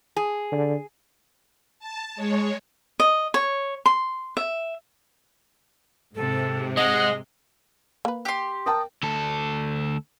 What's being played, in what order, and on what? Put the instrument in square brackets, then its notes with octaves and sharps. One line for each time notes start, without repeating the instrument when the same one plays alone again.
[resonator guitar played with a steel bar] G#4
[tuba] D3
[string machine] A5
G#3 C#5
[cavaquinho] D#5
C#5
C6
E5
[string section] G#2 C3 [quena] A4
[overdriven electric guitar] G#3 [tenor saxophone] D#5 [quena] F#5
[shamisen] A#3 B4
[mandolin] G4 C6
[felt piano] A#4 G5 A5 [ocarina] D#6
[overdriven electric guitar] D2 A4